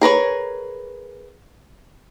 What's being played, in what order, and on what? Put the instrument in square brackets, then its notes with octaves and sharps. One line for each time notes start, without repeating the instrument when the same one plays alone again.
[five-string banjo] G#4 A#4 B4 C#5